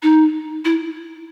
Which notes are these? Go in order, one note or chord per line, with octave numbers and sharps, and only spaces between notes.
D#4
E4